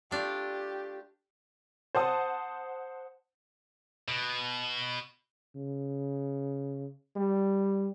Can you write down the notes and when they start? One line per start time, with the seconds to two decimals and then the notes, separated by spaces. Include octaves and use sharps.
0.11 A3 D4 F4 G4
1.95 C5 F#5 A5 D#6
4.08 B2
5.56 C#3
7.16 G3